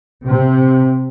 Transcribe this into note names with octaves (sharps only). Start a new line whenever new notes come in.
C3